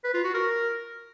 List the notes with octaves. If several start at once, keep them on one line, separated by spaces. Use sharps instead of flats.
B4
F4
F#4
A#4